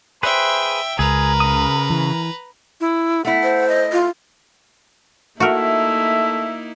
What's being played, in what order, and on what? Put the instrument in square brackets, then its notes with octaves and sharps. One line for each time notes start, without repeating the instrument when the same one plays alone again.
[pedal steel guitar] G#4 B4 [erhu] C5 [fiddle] E5 G5
[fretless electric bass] C#2 [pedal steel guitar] G#4 [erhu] A#4 [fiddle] B4 A#5
[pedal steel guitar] C#3 D#6
[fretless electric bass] E3
[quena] E4
[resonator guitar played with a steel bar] A3 E4 [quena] F#5
[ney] C5
[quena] D#5
[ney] F4
[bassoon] A3 [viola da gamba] A#3 D#4 E4 [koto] F#4 A#4 [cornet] E5